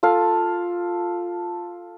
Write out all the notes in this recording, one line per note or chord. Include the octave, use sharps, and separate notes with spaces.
F4 A4 F5